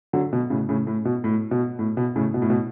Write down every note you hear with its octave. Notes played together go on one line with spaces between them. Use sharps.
D3 F#3
B2
A2 C#3
A2 C#3
A2
B2
A2
B2
A2
B2
A2 C#3
B2
A2
B2